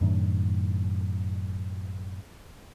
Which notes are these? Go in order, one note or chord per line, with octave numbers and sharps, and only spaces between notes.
F#2 A2 D#3 D4